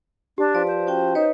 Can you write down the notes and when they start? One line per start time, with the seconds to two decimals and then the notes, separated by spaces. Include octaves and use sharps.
0.38 D4 G4
0.55 F3 B4 D5
0.68 C5
0.87 C#4 F#4 G5
1.15 D#4 B4 C#5 D#5